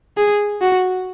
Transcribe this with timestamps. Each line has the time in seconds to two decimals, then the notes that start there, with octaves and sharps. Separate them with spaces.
0.17 G#4
0.62 F#4